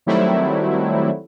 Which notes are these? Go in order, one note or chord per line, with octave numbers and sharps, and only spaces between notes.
D#3 F#3 G3 A3 C4 E4